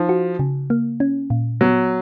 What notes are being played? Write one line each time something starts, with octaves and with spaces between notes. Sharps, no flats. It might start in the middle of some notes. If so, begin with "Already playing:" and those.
Already playing: F3 D#4
F#4
C#3
A#3
C#4
A#2
F#3 B3